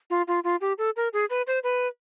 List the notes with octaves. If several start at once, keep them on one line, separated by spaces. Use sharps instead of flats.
F4
F4
F4
G4
A4
A#4
G#4
B4
C5
B4